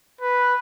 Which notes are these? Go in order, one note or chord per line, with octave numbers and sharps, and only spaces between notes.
B4